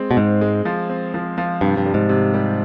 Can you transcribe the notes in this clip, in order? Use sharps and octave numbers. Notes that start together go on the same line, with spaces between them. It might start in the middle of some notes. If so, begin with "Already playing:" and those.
Already playing: G#3 C4
B2
G#2 C4
G#3
F3
C4
F3
F3
G2 C3
G2
G3
G#2
C3
G3